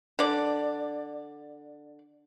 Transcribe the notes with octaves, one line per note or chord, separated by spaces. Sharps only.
D3 D5